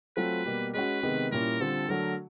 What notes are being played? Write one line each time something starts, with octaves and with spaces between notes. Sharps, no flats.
F#3 A3 C4 F4 B4
B2 G3 A#3
G#3 C#4 F#4 B4
C3 D#3 G#3 B3
A#2 G3 A#3 C#4 E4 A#4
D3 G3 C4 F4 A4
D3 F#3 A3 A#4